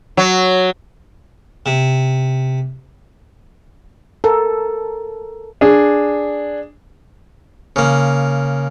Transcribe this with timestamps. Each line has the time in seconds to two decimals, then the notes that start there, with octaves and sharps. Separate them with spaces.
0.17 F#3
1.66 C3
4.24 A4 A#4
5.61 D4 G#4
7.76 C#3 A#3